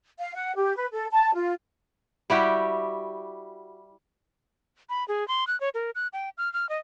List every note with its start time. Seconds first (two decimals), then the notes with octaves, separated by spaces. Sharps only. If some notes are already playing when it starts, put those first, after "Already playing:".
0.18 F5
0.35 F#5
0.56 G4
0.76 B4
0.92 A4
1.11 A5
1.34 F4
2.30 G3 E4 F#4 G4
4.89 B5
5.08 G#4
5.28 C6
5.47 F#6
5.61 C#5
5.74 A#4
5.95 F#6
6.13 G5
6.38 F6
6.53 F6
6.69 D#5